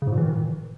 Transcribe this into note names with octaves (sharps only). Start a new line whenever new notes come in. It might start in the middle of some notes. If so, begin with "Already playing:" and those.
C#3
G#2
A#2
E3
D#3